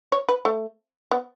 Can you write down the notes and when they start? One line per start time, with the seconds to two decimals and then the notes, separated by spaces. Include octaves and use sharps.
0.12 C#5
0.29 B4
0.45 A3
1.11 B3